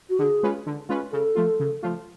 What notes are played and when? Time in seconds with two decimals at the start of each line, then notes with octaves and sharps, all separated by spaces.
0.10 F#4
0.19 D3 G#4
0.43 G#3 C#4 F4 B4
0.66 D3
0.89 G#3 C#4 F4 B4
1.12 C#3 A4
1.35 F3 A3 F4
1.60 C#3
1.83 F3 A3 F4